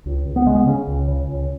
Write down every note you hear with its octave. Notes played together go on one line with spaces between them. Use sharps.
C#2
C#2
B3
C#3 G#3
B3
C#3 C#4
C#2
C#3
C#2